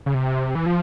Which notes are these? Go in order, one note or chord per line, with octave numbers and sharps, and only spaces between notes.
C#3
C3
E3
F3